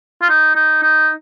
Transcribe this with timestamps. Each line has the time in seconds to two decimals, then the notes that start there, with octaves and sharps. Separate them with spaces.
0.22 F4
0.29 D#4
0.56 D#4
0.83 D#4